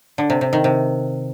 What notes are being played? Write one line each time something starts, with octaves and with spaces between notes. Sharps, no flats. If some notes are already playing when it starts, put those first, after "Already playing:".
D3
C3
C3
D#3
C3